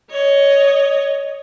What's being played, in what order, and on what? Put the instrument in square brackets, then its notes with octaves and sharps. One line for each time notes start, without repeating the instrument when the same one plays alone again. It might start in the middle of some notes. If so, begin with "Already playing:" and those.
[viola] C#5 D#5